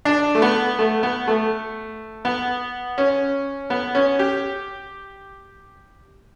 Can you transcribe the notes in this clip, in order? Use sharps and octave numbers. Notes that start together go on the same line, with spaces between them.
D4
A3
B3
A3
B3
A3
B3
C#4
B3
C#4
G4